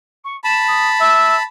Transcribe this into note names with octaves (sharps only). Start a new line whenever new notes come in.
C#6
A5 B5 E7
D#6
E5